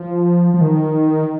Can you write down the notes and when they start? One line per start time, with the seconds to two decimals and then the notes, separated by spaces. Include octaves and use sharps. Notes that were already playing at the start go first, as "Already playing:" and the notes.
Already playing: F3
0.54 F3
0.61 D#3